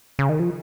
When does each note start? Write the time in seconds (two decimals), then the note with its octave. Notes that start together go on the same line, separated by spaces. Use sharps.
0.19 C#3
0.29 D#3
0.40 F3